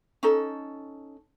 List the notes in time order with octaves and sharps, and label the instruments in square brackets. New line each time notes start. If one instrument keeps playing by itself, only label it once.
[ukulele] C#4 D#4 A4